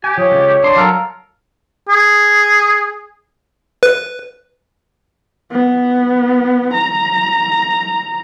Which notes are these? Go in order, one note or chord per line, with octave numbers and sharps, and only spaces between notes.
G4 G#5
F3 C#5
C#2
D4 D5 C6
F#3 A4 A#4 F5
G#4
B4
B3
A#5